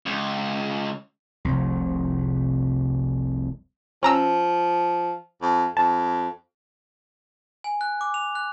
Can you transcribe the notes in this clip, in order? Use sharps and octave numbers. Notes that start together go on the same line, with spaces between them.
C#2
F1 C2
F3 C#4 A#5 E6
F2
F2 A5
G#5
F#6
D6
F7
F#6